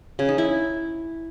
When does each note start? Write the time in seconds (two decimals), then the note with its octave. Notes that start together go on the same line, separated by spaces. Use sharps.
0.19 C#3
0.29 D#4
0.38 E4